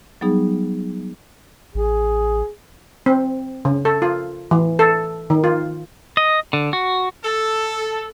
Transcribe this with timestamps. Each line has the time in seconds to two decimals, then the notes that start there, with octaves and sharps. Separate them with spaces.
0.21 F#3 G3 B3 D#4 G#4
1.75 A1 G#4
3.06 C4
3.65 C#3
3.85 A4
4.02 F4
4.51 E3
4.79 A4
5.30 D#3
5.44 F4
6.17 D#5
6.53 D3
6.73 F#4
7.24 A4